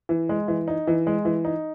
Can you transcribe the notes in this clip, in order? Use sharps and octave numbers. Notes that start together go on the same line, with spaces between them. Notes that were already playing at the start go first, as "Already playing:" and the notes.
E3
G#3
E3
D#4
E3
G#3
E3
D#4